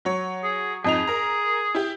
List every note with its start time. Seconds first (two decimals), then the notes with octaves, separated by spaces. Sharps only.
0.05 F#3 C#5
0.44 G#4
0.85 F2 D#4 G#4 F7
1.07 A#4 A#5
1.75 E4 G4